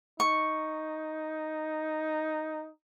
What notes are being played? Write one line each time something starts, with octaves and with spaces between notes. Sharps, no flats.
D#4 C#6